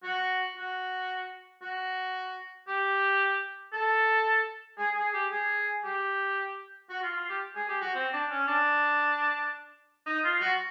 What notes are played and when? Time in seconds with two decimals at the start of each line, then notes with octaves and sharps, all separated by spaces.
0.03 F#4
0.57 F#4
1.62 F#4
2.68 G4
3.73 A4
4.78 G#4
4.96 G#4
5.14 G4
5.32 G#4
5.84 G4
6.90 F#4
7.03 F4
7.16 F4
7.29 G4
7.55 G#4
7.69 G4
7.82 F#4
7.95 C4
8.13 D4
8.31 C#4
8.48 D4
10.07 D#4
10.24 F4
10.41 F#4